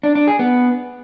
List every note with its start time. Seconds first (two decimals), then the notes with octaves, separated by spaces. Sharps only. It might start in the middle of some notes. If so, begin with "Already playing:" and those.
0.03 D4
0.15 D4
0.27 G#4
0.39 B3